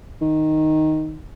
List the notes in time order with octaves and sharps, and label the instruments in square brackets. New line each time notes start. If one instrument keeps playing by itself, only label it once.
[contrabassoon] D#3